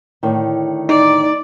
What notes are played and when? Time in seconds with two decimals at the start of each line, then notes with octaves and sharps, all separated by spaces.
0.23 A2 D3 D#3
0.89 D#4 D5